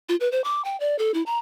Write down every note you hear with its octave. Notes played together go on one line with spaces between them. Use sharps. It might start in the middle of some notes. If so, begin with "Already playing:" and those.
F4
B4
C5
D6
G5
D5
A4
E4
A#5